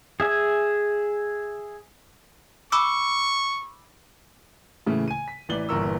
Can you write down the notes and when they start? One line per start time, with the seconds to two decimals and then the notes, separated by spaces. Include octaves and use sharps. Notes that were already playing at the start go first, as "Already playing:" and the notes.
0.20 G#4 E5 G#5
2.72 B5 C#6 D6 E6
4.87 A2 C#3 E3 A3
5.08 G#5 D#7
5.28 B6
5.49 A1 E3 D5 F#7 G7
5.69 G1 A#2 E3 A#4 C#6 E6